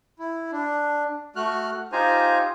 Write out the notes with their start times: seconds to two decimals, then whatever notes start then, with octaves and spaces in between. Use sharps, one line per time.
0.19 E4
0.52 D4
1.36 A3 F#4 F6 F#6
1.92 D#4 F4 G4 C5 G#5 A#5